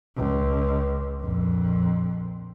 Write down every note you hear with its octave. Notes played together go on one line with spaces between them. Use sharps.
C#2
A#1 F2